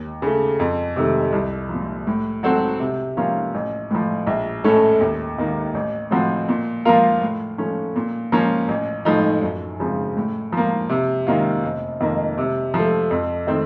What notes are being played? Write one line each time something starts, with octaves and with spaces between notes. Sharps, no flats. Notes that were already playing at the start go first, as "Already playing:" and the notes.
Already playing: D#2
C#3 A3
F2
C3 D#3 A3
C2
A#2 F3
A2
F#3 C4 F#4 A4
C3
F3 A#3 C#4 F4
A1
A2 F3
A#1
A2 A3 C#4 A4
D#2
D#3 A#3
A1
A2 F3 C4 F#4
A#2
F3 A#3 F4 A#4
A2
F3 A3 C#4
A#2
F3 A#3 C#4
A1
A2 F3 A3 D#4
F#2
C#3 F3 C4
A2
F3 A#3
C3
D#3 A#3 C#4 F4
F1
F2 D#3 A#3
C3
F3 A3
F2
D#3 A3 C4 D#4